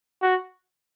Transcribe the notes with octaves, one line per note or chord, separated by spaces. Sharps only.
F#4